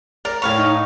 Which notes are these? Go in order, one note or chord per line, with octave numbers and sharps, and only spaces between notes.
A#4 D5
A2 C#5 F5 G#5 B5
D#4